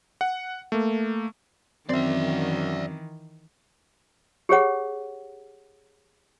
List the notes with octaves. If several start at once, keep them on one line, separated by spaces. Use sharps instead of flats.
F#5
A3 A#3
F#2 D#3 E3 C4 D5 E5
G4 G#4 C#5 F#5